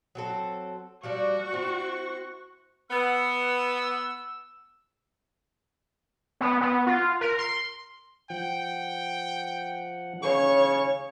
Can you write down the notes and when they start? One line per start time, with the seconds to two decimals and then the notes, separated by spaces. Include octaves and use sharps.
0.15 F#3 C4 A4
1.03 F3 G3 D4 F#4 C#6
1.52 C4 E4
2.91 B3 E6
6.41 B3
6.61 B3
6.87 F4
7.21 A#4
7.38 C6
8.30 F3 F#5 G5
10.23 C#3 C#5 C#6